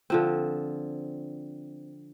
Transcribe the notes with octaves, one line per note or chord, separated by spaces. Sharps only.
D3 F3 C4